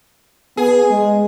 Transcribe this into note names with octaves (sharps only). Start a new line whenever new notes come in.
B3 G#4
G#3